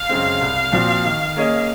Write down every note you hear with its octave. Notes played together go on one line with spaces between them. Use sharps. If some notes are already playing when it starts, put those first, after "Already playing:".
Already playing: F5
F#2 C#3 G#3 C4
C2
A#2 F3 C4 F#4
D#3
A#3 C#4 G#4 D#5